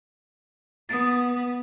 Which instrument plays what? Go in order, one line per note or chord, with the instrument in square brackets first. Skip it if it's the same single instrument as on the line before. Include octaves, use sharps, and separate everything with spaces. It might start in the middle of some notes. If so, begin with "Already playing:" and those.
[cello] B3 [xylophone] D#6 A6